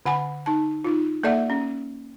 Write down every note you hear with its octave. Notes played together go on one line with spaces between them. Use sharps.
D3 F#5 G#5 B5
D#4 A5
D#4 F4
A#3 A4 D5 E5 F#5
C#4